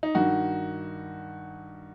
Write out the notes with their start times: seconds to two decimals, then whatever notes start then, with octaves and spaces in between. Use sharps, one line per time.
0.03 D#4
0.15 G2 D#3 F#4